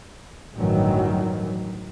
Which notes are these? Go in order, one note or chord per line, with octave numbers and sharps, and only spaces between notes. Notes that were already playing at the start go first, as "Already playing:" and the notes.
A1 D2 G2 D#3 E3 F#3